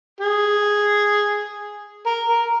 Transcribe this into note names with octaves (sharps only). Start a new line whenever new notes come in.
G#4
A#4
A#4